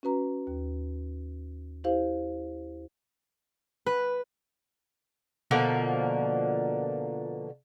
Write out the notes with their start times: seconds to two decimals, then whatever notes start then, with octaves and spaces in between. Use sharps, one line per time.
0.03 C#4 F#4 B4 A#5
0.47 D#2
1.84 E4 G4 C5 F5
3.86 B4
5.51 B2 D3 F3 A#3